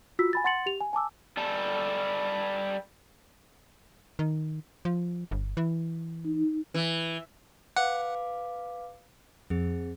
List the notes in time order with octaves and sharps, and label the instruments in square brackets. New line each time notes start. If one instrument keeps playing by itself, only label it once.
[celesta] F4 F#4 E6 B6
G#5 B5 A6
F#5 C6 A6 C#7 F#7
G4 F7
G#5
G#5 A5 D6 E6
[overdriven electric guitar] G3 A4
[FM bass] D#3
F3
G1
E3
[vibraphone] D#4
[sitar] E3
[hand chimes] B4 F5 D6 [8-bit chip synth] F#5
[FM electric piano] F2 [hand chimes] C4 G#4